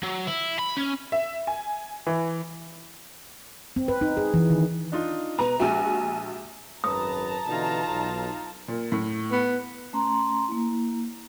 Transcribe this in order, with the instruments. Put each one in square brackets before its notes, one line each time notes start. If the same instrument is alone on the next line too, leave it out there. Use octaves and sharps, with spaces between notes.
[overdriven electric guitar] F#3
E4
B5
C#4
[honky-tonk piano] E5
G#5
E3
[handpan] C4
B4
D#4
G#4
E3
D#3
[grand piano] D4 D#4 F4
[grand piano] B2 [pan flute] B4 [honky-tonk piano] A#5
[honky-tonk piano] A#1 F#4 [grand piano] G#3 G4 E5 [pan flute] G#5
[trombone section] G#1 F#2 B4 [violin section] A5 A#5 [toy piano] D#6
[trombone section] B2 D3 E3 [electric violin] D#4 F4
[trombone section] B1
[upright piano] A#2
A2
[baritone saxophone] B3
[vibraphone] A3 C#4 A#5 C6
A#3 E4